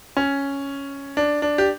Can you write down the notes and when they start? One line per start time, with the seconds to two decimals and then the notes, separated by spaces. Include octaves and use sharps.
0.17 C#4
1.17 D4
1.42 D4
1.58 G4